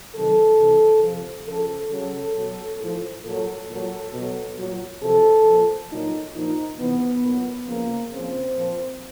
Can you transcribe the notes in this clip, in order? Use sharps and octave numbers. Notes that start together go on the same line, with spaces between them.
C3 D#3 F#3 A4
C3 E3
C3 F3
C#3 F3 A4
C#3 F#3 A4
B2 F#3
A2 F3
A#2 F#3 A4
A#2 F#3
B2 F#3
A#2 F#3
C3 F3 A4
A#2 F3
A#2 F#3 D#4
A#2 F3 D#4
C3 E3 B3
A#2 F#3
C#3 F3 A#3
C#3 F3 C4
A#2 F3